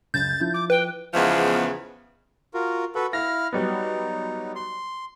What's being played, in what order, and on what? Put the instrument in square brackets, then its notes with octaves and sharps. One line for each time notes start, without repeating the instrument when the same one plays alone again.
[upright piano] C#2 F#2 [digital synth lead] G6 [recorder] A6
[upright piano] F3 E4
[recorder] D6
[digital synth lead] B4 [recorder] G5
[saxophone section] E2 C#3 F3 G#3 B3 E5
[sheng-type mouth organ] F4 F#4 A#4
[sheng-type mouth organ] F#4 A4 B4 [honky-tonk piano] F#5
[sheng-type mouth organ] E4 F5 F6 [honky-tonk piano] A#6
[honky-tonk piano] F#3 G3 B3 [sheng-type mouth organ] D#4
[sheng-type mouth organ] C6